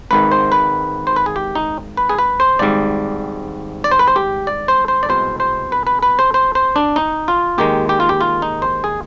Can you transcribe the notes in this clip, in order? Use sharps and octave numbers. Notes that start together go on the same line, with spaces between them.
G#1 G#2 D#3 B4
C5
B4
C5
B4
G#4
G4
D#4
B4
G#4
B4
C5
G#1 G#2 G3 D5
D5
C5
B4
C5
G4
D5
C5
C5
D5
C2 B2 G#3 C5
C5
B4
B4
B4
C5
C5
C5
D4
D#4
F4
D#2 D#3 G#3 G4
G4
F4
G4
F4
D#4
C5
G#4